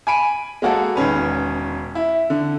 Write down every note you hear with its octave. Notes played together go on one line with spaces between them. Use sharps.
G#5 B5 D7 D#7
G#3 A#3 F#4 A4
E1 D#3 C#4 B4
E4
D3